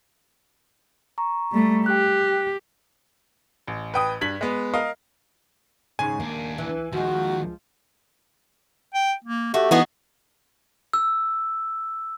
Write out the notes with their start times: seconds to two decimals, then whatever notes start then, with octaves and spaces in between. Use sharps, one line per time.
1.18 A#5 C#6
1.52 G3 A3
1.86 G4 G5 F#6
3.68 A1
3.94 B4 G5 D#6
4.21 G2 G#6 B6 F#7
4.41 G#3 B3
4.74 A#4 D#5 F5
5.99 D#2 G#2 C#3 G#5
6.20 D#2 A#3 D4
6.58 E3
6.93 D#2 D#3 F3 G#3 F#4
8.94 G5
9.24 A#3
9.54 A3 F#4 G4
9.71 E3 B3 D#4 F#4 G#4
10.93 E6